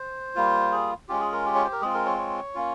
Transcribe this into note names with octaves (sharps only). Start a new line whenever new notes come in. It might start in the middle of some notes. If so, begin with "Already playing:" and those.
Already playing: C5
G3 A#3 F4
G#4
G#3 C#4 F4 G4
G#4
A#4
G4
C#5
C5
A#4
G#3 C4 F4 G#4
A#4
C#5
C#5
A#3 C#4 F4